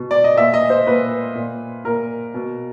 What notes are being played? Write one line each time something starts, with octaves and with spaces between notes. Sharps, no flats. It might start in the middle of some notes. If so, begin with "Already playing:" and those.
Already playing: B2
D5
D#5
A#2 E5
D#5
C5
A#2 B4
A#2
A#2 A#4
B2